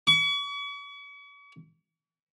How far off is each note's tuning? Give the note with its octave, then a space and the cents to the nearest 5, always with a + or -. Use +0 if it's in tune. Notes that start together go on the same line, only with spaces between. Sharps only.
C#6 +45